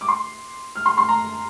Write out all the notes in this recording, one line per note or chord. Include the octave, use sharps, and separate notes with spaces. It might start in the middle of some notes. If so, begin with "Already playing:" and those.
D6
C6
F6
C6
C6
A#5